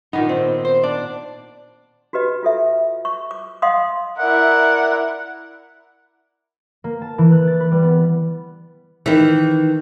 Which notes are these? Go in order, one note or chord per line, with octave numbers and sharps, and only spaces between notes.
A#2 D#3 B3 D#4
C4
C5
D4 D5
F#4 G4 B4 D#5
F4 A4 E5
C#6
D6
D#5 F5 F#5 C6 D6 D#6
E4 A#4 D5 E5 F#5
A#3
A5
E3
F#6
A6
B4
G3
B3
D#3 E3